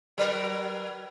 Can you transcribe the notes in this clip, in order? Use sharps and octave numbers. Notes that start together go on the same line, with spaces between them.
F#3 A#4 B4